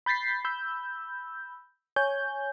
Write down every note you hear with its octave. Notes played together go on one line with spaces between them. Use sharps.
B5 G6 A6 B6 C7
B5 E6 G6
C#5 G#5 G6